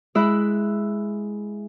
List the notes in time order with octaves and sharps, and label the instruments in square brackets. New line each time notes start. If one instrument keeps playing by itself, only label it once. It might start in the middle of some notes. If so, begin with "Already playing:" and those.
[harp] G#3 E4 E5 B5 F#6